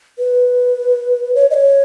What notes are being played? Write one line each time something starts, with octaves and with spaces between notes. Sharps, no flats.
B4
C#5
D#5
C#5